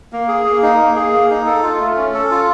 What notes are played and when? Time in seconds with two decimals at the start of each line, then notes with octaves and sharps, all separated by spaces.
0.13 A#3
0.28 G#4
0.45 A#3
0.62 D#4
0.79 A#3
0.96 G#4
1.13 A#3
1.30 D#4
1.46 A4
1.63 F4
1.80 A3
1.96 C#4
2.14 A4
2.31 F4